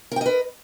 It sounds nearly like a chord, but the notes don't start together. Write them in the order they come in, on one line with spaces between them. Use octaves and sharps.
A#4 G5 D#5 B4